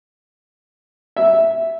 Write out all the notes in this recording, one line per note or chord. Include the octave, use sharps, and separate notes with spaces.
E5